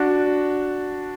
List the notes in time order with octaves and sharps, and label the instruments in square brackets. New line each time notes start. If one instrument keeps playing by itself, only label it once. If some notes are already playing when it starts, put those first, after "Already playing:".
Already playing: [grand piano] D4 F#4